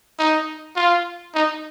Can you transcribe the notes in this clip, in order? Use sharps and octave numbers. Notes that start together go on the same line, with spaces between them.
D#4
F4
D#4